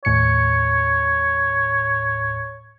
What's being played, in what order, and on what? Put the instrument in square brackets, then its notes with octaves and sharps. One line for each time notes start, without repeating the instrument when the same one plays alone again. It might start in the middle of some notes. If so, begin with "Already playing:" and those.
[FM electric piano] D#2 A2 C#7 [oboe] C#5